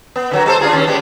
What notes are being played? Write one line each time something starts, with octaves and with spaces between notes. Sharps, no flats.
B3
D3 F#3 F#4
G3 A4 C5
D4 F4 G#4
D#2 C#4
G3 G#3 B3